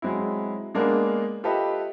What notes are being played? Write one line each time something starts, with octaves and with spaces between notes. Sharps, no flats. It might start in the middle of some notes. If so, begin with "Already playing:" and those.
F#3 G#3 C4 E4
G#3 A#3 B3 D4 A#4
F4 G4 A4 B4 D#5 E5